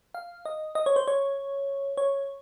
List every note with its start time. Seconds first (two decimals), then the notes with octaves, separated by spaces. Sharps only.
0.14 F5
0.45 D#5
0.75 D#5
0.86 C#5
0.96 C5
1.08 C#5
1.97 C#5